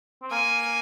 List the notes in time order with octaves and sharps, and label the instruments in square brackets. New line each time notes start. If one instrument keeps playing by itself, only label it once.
[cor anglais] C4
[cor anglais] A#3 [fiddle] G#5